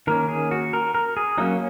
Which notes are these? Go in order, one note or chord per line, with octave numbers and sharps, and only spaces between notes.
D#3 A#3 C#4 A#4
G#4
F#4
A#4
A#4
G#4
F#3 A#3 C#4 D#4